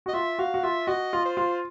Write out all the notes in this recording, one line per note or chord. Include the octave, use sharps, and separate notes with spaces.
F#4 D#5
F4 E5
F#4 F5
F#4
F4 E5
F#4 D#5
F4
C5
F4